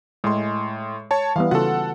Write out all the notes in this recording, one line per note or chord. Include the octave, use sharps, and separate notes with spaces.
A2 G#3 C6
C#5 A5
E3 G3 B3 F5
C#3 F4 F#4 A4 F#5